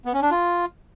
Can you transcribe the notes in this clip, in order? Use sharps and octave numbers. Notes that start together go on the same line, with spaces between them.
B3
C#4
D4
F4